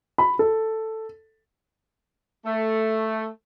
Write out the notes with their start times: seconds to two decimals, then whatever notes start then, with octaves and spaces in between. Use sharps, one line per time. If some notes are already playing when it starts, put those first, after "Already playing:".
0.18 B5
0.39 A4
2.45 A3